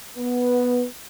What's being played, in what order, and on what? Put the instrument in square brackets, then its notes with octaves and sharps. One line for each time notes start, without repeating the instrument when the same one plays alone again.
[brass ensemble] B3